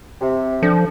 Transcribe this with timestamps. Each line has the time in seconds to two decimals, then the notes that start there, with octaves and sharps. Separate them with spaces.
0.21 C3
0.63 F3 D4 A4